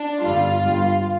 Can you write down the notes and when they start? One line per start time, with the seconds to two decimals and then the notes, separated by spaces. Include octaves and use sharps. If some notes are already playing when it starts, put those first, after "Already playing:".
Already playing: D4
0.23 G1 G2 D3 G3 F4
0.61 G1 G2 G3